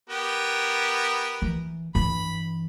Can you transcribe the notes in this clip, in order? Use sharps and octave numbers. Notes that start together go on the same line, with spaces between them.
B3 G4 A#4
E3
G2 E3 B5